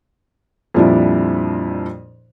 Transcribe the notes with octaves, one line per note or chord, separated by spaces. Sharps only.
F2 A#2 F3 G3 D4 E4